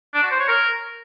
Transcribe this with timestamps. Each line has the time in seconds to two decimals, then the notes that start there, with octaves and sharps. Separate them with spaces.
0.14 D4
0.23 F#4
0.31 C5
0.40 C#5
0.48 A#4